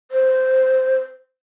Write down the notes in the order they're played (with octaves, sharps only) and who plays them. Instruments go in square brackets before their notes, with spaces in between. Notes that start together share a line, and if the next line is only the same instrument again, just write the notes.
[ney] C5